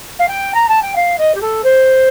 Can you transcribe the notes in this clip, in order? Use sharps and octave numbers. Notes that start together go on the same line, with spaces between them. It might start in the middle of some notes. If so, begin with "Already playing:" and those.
F5
G5
A#5
A5
G5
F5
D#5
G4
A4
C5